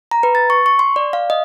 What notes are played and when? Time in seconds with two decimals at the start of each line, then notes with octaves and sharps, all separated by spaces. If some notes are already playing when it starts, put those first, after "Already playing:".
0.11 A#5
0.23 B4
0.35 A6
0.50 C#6
0.66 C#6
0.79 C6
0.96 D5
1.13 F5
1.30 D#5